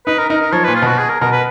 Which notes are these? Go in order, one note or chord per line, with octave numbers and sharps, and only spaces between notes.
D#4 B4
A#4
D#4 A#4
A#4
F3 C#5
A#2 B4
F4
B2 F#4
G#4
A#4
B2 A#4
B4